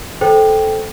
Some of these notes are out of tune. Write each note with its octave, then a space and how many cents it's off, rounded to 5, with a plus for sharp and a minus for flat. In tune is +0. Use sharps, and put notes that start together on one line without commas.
A4 -10 C5 +0 G5 +0